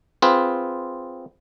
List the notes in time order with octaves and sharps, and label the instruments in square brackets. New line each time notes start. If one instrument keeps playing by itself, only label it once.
[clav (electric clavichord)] C4 F4 G#4 B4